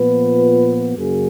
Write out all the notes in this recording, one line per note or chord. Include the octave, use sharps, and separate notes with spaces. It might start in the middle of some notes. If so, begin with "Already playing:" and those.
Already playing: A#2 F3 B3 B4
F#2 C#3 F#3 A#3 G#4